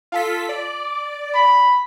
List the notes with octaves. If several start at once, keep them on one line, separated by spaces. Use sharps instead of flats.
F4 A4 B6
D5
B5